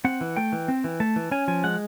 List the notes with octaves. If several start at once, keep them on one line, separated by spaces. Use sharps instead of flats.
C4 F#5
E3
A3 G5
E3
C4
E3
A3 A5
E3
C#4 G#5
F3 G#5
G#3 F#5